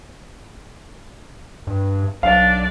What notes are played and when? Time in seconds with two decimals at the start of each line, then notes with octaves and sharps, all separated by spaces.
1.67 G2
2.23 B1 D4 D5 F5